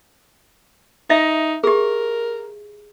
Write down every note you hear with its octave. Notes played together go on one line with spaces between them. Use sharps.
D#4 E5
G4 G#4 A#4